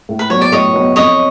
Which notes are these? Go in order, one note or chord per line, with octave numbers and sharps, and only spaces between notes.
A2
B4
F#3 B3 C#5
D5
A2 C#5 D#5
F#3 B3
F2 C#5 D#5